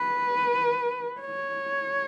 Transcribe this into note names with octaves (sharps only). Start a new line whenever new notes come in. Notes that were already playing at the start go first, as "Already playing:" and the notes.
Already playing: B4
C#5